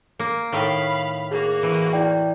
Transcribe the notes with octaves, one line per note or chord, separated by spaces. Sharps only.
A#3
A2 D#3 F5 B5
A#3 F#4 G#4
E3
E4 D5 G5